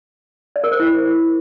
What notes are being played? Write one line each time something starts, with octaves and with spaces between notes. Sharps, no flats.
D5
A#4
C5
E4